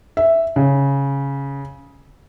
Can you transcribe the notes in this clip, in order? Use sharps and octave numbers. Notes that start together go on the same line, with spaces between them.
E5
C#3